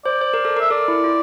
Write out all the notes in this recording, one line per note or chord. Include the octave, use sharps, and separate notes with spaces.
C5 D5
C5
A#4
A4
A#4 E5
A4 D5
E4
F4